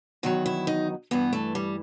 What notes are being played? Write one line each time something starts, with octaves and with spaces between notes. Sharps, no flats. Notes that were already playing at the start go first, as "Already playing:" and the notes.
E2 D#3 F#3 F#4
E4
D#4
G2 E3 B3
A3
G3